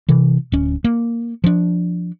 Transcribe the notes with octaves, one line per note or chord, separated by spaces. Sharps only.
C3 E3
D1 C#4
A#3
F3 D4